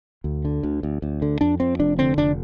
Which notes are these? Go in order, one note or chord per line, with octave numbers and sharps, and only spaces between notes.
D2
D3
D2
D2
D2
D3
F2 D4
F2 C4
F1 D4
D3 C4
F1 D4